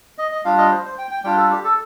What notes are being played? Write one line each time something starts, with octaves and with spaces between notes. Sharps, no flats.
D#5
D#5
G3 D4 F4 F5
D#5
C5
C5
G5
G5
G3 D4 F4 G5
A4
G4
A4